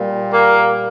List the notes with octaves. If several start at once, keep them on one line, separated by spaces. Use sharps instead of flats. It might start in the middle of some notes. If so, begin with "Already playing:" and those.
Already playing: A#2 G3
A#3